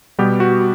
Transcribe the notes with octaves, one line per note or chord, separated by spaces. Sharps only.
B2 G3 B3 G4
F#4